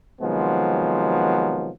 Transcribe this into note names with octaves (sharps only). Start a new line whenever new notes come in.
C3 D#3 F3 F#3 G#3 B3